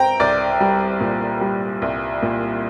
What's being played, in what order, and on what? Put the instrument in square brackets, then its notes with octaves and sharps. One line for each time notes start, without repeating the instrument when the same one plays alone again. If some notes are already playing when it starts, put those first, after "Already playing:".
Already playing: [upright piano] C4 G5 A#5
C2 D5
G3
A#2
G3
C2
A#2